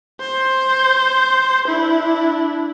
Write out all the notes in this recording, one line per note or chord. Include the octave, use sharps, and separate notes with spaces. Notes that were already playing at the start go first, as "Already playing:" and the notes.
C5
D4 E4